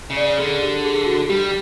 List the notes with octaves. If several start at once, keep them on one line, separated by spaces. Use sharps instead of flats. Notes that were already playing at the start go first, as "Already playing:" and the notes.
C#3
D5
D3 G#4
G4
G#4
F#4
G3 G4